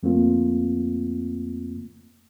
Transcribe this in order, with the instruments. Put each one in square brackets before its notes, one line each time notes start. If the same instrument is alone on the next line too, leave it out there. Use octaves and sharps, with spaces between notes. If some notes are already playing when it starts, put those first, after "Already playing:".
[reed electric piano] F2 A3 A#3 C4 F4